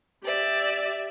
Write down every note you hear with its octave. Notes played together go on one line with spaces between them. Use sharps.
G4 D5 E5